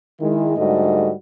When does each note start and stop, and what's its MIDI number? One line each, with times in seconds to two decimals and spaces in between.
0.20 0.56 51
0.20 0.56 56
0.20 0.56 64
0.57 1.11 44
0.57 1.11 50
0.57 1.11 55
0.57 1.11 57
0.57 1.11 66
0.57 1.11 75